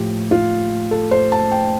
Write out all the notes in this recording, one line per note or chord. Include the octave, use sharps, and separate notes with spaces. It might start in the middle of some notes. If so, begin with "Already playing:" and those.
Already playing: A2 F3 G4
F4
A4
C5
A5
G5